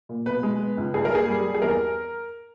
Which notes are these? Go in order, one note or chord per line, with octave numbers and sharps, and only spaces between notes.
A#2
B2 B4
G#3
B3
C#2
G2 G#4
A#4
A#3 G#4
G3
G3
G#4
E2 A#4